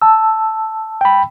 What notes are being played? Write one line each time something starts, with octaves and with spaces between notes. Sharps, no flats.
A5 E6
G5 B5